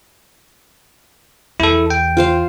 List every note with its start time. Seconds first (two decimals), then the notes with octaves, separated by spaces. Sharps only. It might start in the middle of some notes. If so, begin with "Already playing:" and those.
1.60 E2 E4 A4
1.90 G5
2.17 F4 C5 F5